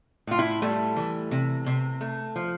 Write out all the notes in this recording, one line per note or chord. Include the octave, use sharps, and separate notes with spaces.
A2 F4
E4
G3 A3
E3
C3
C3
A3
F3